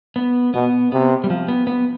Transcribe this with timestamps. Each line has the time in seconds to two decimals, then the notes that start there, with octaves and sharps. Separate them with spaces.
0.16 B3
0.54 B2 B3
0.92 C3 B3
1.24 G3
1.30 F3
1.48 B3
1.67 B3